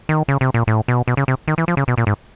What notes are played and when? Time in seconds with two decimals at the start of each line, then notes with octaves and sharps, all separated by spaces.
0.09 D#3
0.28 C#3
0.41 C3
0.54 A#2
0.67 A2
0.88 B2
1.08 B2
1.17 C#3
1.28 C3
1.48 D#3
1.58 E3
1.68 F3
1.77 C#3
1.88 B2
1.98 A#2
2.07 G#2